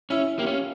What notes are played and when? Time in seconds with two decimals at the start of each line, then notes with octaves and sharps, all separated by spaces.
0.10 C#4 E4
0.39 A#3 G4
0.46 C#4 F4